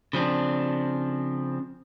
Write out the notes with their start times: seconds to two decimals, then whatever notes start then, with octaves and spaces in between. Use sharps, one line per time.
0.13 C#3 F3 C4 D4